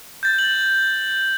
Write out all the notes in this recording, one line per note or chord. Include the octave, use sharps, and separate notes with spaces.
G6 A6
F#7